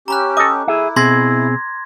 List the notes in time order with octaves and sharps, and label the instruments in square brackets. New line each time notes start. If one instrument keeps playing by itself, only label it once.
[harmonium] C#4 G4 [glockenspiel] A#5 B5 F#6
[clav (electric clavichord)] A4 D#5 [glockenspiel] D6
[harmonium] E4 [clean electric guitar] G#4 E5
[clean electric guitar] B2 C4 G#4 [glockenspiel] C6 G#6 A#6